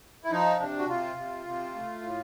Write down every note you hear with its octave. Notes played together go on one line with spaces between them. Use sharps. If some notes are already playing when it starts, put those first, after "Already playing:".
E4
F3 D#4
C3 D4
F#4
C3 F4
C3
C3
A3
A2